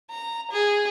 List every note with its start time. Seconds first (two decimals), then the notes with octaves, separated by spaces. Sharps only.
0.10 A#5
0.51 G#4